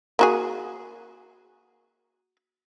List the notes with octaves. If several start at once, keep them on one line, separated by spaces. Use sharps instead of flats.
A#3 F#4 G#4